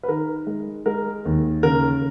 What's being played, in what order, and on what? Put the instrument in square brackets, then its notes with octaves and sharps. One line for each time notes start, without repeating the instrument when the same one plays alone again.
[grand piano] B4
D#3 A#4
G#3
G#3 A#4
D#2
C#3 A#4